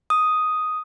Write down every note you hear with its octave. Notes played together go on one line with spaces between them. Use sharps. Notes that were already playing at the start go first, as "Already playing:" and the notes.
D#6